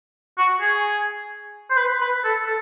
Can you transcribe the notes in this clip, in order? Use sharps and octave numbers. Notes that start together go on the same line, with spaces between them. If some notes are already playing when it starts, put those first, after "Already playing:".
F#4
G#4
C5
B4
B4
A4
A4